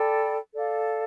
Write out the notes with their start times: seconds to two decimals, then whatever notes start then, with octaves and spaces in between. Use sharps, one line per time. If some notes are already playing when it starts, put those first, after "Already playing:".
Already playing: A4 D5 G5 B5
0.53 A4 D5 F5